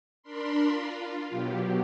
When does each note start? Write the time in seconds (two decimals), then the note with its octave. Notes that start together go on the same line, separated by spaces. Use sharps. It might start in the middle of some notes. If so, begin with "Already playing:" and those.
0.23 D4 A#4 B5 C6
0.66 F4
1.27 B2 F#3 G4